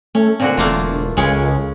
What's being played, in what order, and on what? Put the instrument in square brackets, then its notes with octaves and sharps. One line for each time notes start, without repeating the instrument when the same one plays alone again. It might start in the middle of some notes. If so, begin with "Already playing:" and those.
[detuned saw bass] A3 [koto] C#4
[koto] A#2 D3 F#4 [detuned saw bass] C4
[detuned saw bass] E1 [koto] A3 A#3 F4
[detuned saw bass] C#2 [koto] C#3 G#3 C#4